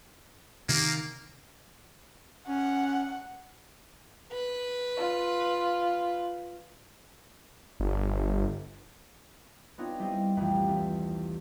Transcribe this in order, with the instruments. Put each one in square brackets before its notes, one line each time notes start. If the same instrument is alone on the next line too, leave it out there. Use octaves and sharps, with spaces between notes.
[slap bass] C3 D#3 [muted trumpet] A#3
[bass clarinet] C#4 [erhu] F#5
[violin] B4
[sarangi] F4
[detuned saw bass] G1
[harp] B3 C4 D4 D#4 F4 C#5
G3 E4 F4 C5 D#5
D#1 C2 F2 E3 A3 G4
E2